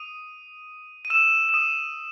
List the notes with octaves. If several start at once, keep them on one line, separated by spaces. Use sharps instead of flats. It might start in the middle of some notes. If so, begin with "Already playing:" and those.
Already playing: D#6 D#7
D#7
E6 E7
E7
D#6 D#7